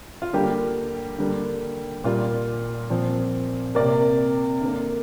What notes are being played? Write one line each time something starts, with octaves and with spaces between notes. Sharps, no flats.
F4
D3 G3 A#3 G4
D3 G3 A#3
A#2 G3 A#3 F4
A#2 F3 C4
C3 A#3 A#4 D5
D3 A#3